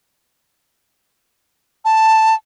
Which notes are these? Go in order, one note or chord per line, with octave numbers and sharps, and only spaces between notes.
A5